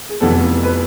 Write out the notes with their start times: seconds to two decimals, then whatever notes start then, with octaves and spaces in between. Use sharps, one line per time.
0.09 G#4
0.21 F1 F2 E3 B3 A4
0.63 B4